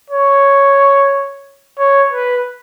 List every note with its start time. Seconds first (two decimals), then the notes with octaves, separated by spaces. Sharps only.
0.10 C#5
1.79 C#5
2.13 B4